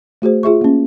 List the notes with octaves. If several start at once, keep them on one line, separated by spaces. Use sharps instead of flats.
A3 F#4 G#4 C5
F4 G#4 E5 C#6
A#3 C#4